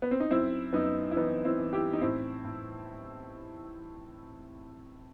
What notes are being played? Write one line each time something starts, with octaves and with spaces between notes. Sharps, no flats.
B3
C4
D#4
F#2 C4 E4
F#2 B3 D#4
E4
E3 B3 D#4
C4 E4
E3
E4 G4
D#4
A2 C4 E4
A2